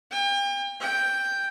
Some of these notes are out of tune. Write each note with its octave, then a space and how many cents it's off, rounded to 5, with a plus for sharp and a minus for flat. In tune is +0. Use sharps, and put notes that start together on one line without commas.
G5 +40
G5 +5